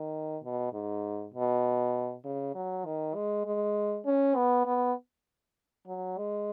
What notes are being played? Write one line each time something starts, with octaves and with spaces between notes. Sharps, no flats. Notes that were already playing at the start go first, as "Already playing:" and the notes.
Already playing: D#3
B2
G#2
B2
C#3
F#3
D#3
G#3
G#3
C#4
B3
B3
F#3
G#3